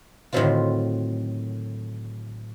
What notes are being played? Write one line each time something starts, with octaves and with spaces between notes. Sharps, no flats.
A2 D3 D#3 F#3 C4 F4